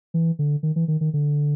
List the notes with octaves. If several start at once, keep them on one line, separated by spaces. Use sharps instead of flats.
E3
D3
D#3
E3
D#3
D#3
D3